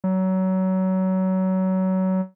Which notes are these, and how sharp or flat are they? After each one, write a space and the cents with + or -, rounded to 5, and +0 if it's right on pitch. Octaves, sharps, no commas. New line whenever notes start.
F#3 +25